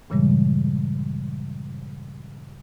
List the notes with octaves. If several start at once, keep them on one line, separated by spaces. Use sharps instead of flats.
G2 A#2 C#3 E3 G3 G#3